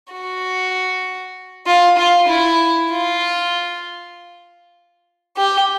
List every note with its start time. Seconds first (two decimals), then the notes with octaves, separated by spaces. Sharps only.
0.13 F#4
1.67 F4
1.98 F4
2.29 E4
2.91 F4
5.37 G4